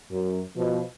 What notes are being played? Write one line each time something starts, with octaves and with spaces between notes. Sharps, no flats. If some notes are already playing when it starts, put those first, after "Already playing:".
F#2
B2 F3